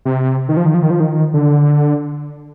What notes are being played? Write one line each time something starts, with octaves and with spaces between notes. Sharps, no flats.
C3
D#3
F3
D#3
F3
D#3
F3
D#3
D3